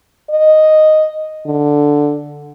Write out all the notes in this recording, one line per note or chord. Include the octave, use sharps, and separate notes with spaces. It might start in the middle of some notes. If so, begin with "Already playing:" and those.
D#5
D3